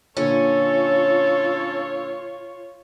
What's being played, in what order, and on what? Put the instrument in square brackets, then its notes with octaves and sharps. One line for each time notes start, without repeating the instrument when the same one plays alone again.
[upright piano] A#2 D3 [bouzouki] C#4 [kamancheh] F4 C#5 [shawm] A4